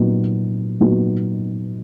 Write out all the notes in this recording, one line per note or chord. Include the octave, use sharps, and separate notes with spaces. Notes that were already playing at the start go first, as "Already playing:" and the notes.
Already playing: A#2 F#3 B3 D#4 F#4
A#2 F#3 B3 D#4 F#4